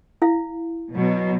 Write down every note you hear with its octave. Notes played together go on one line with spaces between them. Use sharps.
E4 F5
B2 F#3